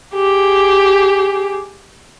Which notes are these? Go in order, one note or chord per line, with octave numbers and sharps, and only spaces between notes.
G4 G#4